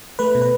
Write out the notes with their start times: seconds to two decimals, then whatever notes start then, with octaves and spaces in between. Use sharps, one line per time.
0.19 A3 B4
0.35 B2
0.42 B4